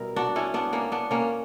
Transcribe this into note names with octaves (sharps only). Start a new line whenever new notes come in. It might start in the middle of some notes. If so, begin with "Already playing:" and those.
Already playing: B2 G3 E4 A#4
D4 F#4
C#4 E4
B3 D4
A#3 C#4
B3 D4
A#3 C#4